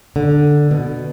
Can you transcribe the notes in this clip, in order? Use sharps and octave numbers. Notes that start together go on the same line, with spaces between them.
D3
B2